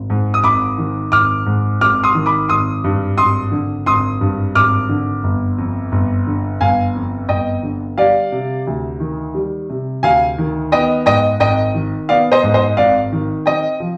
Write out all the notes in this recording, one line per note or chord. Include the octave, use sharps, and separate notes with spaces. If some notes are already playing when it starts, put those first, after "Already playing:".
Already playing: G#1
G#2
D#6
G#1 B5 D6
D#3
G#1 D6 F6
G#2
G#1 D6 F6
C6 D#6
D#3
B5 D6
G#1 C6 D#6
G2
G#1 C6 D#6
D3
G#1 C6 D#6
G2
G#1 D6 F6
D3
G1
F2
G1
D3
G1 F5 G#5
F2
G1 D#5 G5
D3
G3 D5 F5
C3
D2
D#3
G3
C3
D2 F5 G#5
D#3
B3 D#5 G5
G#2 D#5 G5
G#1 D#5 G5
D#3
B3 D5 F5
C5 D#5
G#2
C5 D#5
G#1 D5 F5
D#3
C4 D#5 G5
F3